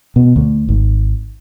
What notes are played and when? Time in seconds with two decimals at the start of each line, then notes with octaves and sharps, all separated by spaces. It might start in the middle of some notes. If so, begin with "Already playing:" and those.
0.16 B2
0.36 D2
0.69 G#1